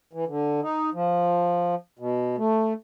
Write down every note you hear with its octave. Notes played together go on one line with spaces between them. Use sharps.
E3
D3
D#4
F3
B2
A3